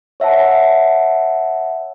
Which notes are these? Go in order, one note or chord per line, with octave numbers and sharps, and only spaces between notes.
C#5 E5 F#5 A5